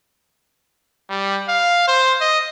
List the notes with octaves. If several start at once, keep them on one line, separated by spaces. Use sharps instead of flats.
G3
F5
C5
D#5